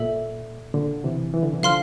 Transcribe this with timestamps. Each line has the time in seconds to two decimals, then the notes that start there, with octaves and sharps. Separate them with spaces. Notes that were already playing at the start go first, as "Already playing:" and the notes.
Already playing: A#2 A4 E5
0.74 A#2 D3
1.04 C3 E3
1.34 E3
1.43 D3
1.53 C3 E3
1.63 D3 F3 F5 C6 F6